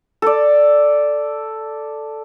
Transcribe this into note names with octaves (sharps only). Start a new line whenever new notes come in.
A4 D5